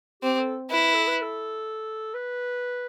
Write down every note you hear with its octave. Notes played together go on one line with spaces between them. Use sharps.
C4 G4
A4
E4 B4
A4
B4
A4
B4